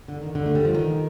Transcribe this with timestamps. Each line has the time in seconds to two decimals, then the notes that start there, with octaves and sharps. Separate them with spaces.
0.08 D3
0.22 D#3
0.35 D3
0.46 A3
0.55 G3
0.65 F3
0.75 D#3